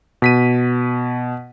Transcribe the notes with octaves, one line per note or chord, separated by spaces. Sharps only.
B2 B6 D#7